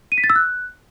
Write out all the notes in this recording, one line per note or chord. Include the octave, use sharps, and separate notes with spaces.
D#7
B6
A6
E6
F#6